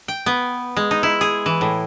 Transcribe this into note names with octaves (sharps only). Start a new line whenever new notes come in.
G5
B3
G#3
D#4
E4
G#4
E3
A2